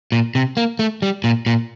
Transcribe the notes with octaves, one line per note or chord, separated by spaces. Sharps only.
A#2
C3
A#3
A3
G3
A#2
A#2